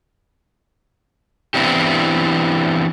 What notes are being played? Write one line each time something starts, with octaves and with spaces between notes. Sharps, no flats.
E3 B3 C4 D4 E4 G4